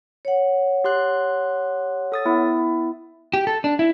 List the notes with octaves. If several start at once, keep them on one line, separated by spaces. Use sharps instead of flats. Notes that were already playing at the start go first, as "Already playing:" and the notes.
C#5 F#5
G4 C6 F#6
A4 D#6 A6
B3 E4 E5
G4
A4
D4
E4